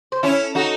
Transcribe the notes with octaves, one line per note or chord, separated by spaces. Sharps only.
C5
C#4 E4 A4
D#4 F#4 A4